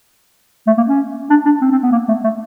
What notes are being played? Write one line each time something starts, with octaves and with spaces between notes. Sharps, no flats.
A3
A#3
C#4
D4
D4
C4
C4
B3
A#3
A3
A3